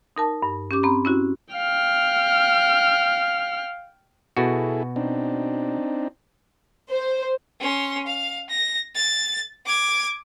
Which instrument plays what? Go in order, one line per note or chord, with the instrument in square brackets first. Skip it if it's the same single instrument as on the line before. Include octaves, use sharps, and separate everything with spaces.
[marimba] D#4 A#4 A5
G2
C#4 G4 D6
C4 A#5 B5
C#4 E4 F#4
[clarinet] F5 [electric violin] G5 F6
[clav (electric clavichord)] B2 F#4 [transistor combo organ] E4 G#4 A4
[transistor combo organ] C4 D4 D#4
[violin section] C5
[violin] C#4 C6
F5
A#6
A6
D6 G#6